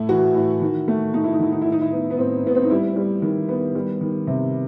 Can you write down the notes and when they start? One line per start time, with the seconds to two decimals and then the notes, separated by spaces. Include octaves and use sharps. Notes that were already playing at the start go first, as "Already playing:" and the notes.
Already playing: A2 A3 E4
0.09 E3 F#4
0.35 A2
0.61 D#3
0.88 A3
1.14 A3 D#4
1.24 E4
1.33 D#4
1.39 D#3 E4
1.52 D#4
1.61 A2 E4
1.72 D#4
1.81 E4
1.91 B3 D#4
2.10 B3
2.17 A2 C4
2.44 A2 B3
2.55 C4
2.62 D#4
2.70 G3 E4
2.96 G3
3.22 D#3
3.49 B3
3.75 G3
4.01 D#3
4.27 C3